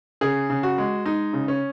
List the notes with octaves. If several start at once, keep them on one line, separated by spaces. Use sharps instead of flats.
C#3 G#4
C#3
F#4
G#3
G#3 D#4
C#3
C#4